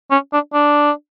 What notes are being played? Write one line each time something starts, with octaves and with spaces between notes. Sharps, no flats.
C#4
D4
D4